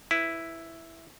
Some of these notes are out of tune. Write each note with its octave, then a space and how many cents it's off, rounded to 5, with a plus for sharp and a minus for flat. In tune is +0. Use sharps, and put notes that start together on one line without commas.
E4 +0 B4 +0